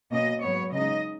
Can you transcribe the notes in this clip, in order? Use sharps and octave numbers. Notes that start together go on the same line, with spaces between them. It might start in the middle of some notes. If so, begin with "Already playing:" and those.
B2 A#3 C#4 D#5
G#2 F#3 B3 C#5
C#3 G#3 D#4 D#5